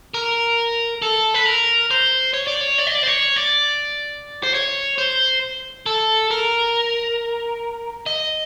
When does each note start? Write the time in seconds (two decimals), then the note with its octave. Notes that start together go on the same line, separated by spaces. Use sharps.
0.14 A#4
1.02 A4
1.34 B4
1.46 A#4
1.91 C5
2.34 C#5
2.47 D5
2.61 C#5
2.78 D5
2.87 D#5
2.95 D5
3.03 C5
3.07 C#5
3.36 D5
4.43 C5
4.54 C#5
4.98 C5
5.86 A4
6.31 A#4
8.06 D#5